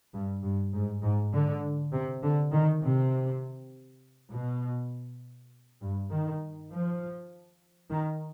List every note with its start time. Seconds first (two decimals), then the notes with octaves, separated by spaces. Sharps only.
0.13 G2
0.43 G2
0.74 G#2
1.03 G#2
1.33 D3
1.92 C3
2.23 D3
2.52 D#3
2.82 C3
4.31 B2
5.81 G2
6.10 D#3
6.70 F3
7.90 D#3